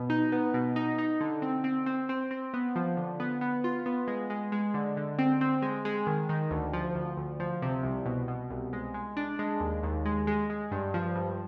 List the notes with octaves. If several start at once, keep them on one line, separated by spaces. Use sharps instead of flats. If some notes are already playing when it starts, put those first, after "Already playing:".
Already playing: B2
D#4
B3
B2
D#4
D#4
D3
C4
C4
C4
C4
C4
B3
F3
D3
B3
B3
F4
B3
G#3
G#3
G#3
D3
D3
C4
C4
G#3
G#3
D#3
D#3
D2
F3
D2
D2
F3
C3
C2
B2
B2
C2
G#3
G#3
D4
G#3
D#2
D#2
G#3
G#3
G#3
G2
F3
G2